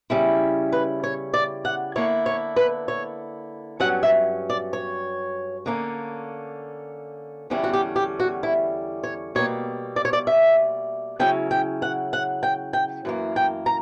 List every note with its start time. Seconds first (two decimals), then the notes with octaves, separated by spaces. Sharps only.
0.10 C#3 G3 C#4 E4
0.72 B4
1.04 C#5
1.34 D5
1.65 F#5
1.96 D3 A#3 E4 C#5
2.26 C#5
2.56 B4
2.88 C#5
3.80 G2 F#3 C#4 F#5
4.03 E5
4.50 D5
4.73 C#5
5.66 D3 A#3 C#4
7.50 E2 D3 G3 C#4 E4
7.63 F#4
7.73 G4
7.96 G4
8.20 F#4
8.43 E4
9.04 C#5
9.35 B2 G3 A#3 C#5
9.96 D5
10.05 C#5
10.13 D5
10.27 E5
11.19 C#3 F#3 C#4 E4 G5
11.51 G5
11.82 F#5
12.13 F#5
12.43 G5
12.73 G5
13.05 F#2 E3 A#3
13.36 G5
13.66 A#5